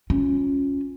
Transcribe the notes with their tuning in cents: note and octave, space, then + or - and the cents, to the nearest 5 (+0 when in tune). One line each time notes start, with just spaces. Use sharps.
C#4 +0 F4 +20